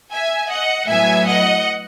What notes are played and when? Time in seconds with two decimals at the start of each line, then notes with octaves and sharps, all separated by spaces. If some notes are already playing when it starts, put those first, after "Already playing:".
0.11 E5 G#5
0.50 D#5 F#5
0.87 A2 F#3 B3 E5 G#5
1.26 D#5 F#5